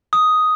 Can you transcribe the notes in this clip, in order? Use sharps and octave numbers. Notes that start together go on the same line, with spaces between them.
D#6